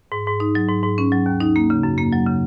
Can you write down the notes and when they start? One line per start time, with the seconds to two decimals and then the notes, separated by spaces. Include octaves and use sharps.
0.12 G#2
0.27 G#2
0.40 D#4
0.55 F#3
0.69 G#2
0.83 G#2
0.98 C#4
1.12 F#3
1.26 D#2
1.40 D#4
1.56 A#3
1.70 C#3
1.83 F#2
1.98 A#3
2.13 F#3
2.26 C#3